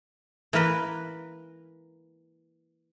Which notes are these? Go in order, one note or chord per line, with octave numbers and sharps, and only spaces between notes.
E3 A#3 A#4 B4